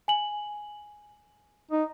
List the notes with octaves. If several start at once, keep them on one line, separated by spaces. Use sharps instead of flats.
G#5 F#7
D#4